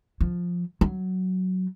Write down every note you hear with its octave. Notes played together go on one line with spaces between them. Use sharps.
F3
F#3